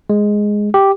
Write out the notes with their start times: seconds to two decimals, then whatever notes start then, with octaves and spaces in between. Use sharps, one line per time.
0.10 G#3
0.74 G4